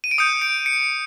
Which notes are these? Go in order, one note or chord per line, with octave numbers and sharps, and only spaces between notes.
D#7
D7
D#6 G6 C#7
D7
C#7